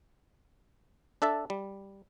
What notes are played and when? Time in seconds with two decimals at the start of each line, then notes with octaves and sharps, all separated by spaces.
1.22 D4 A4 E5 A5
1.50 G3